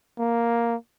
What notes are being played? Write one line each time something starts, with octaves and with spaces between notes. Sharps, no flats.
A#3